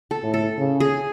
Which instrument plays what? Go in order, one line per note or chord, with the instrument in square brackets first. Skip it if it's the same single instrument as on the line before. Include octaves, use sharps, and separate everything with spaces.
[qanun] A4
[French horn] A2
[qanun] A4
[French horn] C#3
[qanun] G#4